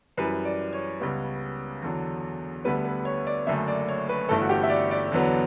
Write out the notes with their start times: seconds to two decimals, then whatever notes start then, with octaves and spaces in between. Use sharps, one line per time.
0.17 F#2 E3 G3 B4
0.45 D5
0.73 C#5
1.00 C#2 C#3 G3 B3
1.82 E2 D3 F#3
2.64 D2 D3 G3 B3 B4
2.84 B4
3.05 C#5
3.27 D5
3.46 F#1 F#2 D3 A3 E5
3.68 D5
3.88 C#5
4.09 B4
4.29 G1 G2 E3 A3 A4
4.41 F#4
4.49 G4
4.63 E5
4.70 D5
4.91 D5
5.12 E2 D3 F#3 B3